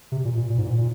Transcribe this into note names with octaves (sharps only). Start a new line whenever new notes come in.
C3
A#2
A#2
A#2
G#2
A#2
A#2